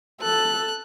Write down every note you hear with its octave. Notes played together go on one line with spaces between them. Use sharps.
A4 F#6